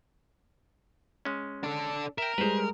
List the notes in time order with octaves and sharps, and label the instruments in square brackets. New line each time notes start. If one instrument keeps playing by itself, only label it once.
[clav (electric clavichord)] G#3 C#4
[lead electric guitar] D4 A4
[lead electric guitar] A#4 [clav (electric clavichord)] E5 G5
[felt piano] G3 G#3 [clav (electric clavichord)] B4 C5